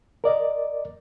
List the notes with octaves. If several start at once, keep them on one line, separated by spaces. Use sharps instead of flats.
A#4 D5 D#5